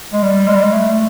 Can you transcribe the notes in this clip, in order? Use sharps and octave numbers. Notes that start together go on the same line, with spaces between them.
G#3
G3
G#3
G3
G#3
A3